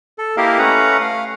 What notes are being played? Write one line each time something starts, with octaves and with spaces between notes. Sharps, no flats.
A4
A#3 E4 G4 A#4 D#5 F5
A3 C#4 B4 F#5 A#5
F5